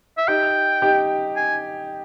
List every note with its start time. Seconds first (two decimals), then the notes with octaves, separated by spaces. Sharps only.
0.18 E5
0.28 D#4 G4 G5
0.82 D#4 G4
1.36 G#5